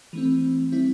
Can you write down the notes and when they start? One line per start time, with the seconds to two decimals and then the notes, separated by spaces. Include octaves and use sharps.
0.13 E3 A3 C4
0.72 G3 C4 E4